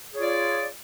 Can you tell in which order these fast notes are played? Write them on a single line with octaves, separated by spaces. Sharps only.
G#4 C#5 F4 D5